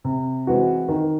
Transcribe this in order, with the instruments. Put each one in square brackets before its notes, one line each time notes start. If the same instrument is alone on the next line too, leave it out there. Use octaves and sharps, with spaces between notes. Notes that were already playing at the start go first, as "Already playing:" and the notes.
[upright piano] C3
E3 G#3 C4 F#4
D#3